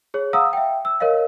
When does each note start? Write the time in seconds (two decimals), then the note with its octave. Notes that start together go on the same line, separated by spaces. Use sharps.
0.14 G#4 C#5
0.33 F5 F#5 A#5 D#6 E6
0.53 E5 G5
0.85 E6
1.00 A#4 C#5 D#5 F5